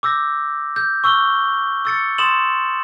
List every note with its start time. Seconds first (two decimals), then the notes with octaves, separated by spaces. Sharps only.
0.03 D6 E6 G6 A#6
0.76 G6
1.04 C#6 E6 F6 G7
1.85 E6 A6 C#7
2.18 C6 D#6 A6 E7 F#7